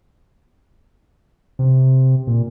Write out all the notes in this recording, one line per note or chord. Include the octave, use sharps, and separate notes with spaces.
C3
A#2